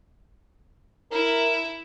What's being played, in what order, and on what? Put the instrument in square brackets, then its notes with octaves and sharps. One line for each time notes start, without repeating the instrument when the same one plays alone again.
[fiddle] E4 E5 [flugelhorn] A#4